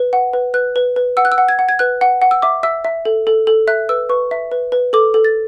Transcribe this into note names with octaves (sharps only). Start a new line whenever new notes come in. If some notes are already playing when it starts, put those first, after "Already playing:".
Already playing: B4
F#5
B4
B4 F#6
B4
B4
F#5 E6
F#6
E6
F#5
G#6
F#5
G#6
B4 F#6
F#5
F#5
E6
E5 D6
E5 E6
E5
A4
A4
A4
E5 F#6
B4 E6
B4 C#6
E5
B4
B4
A4 D6
A4
A6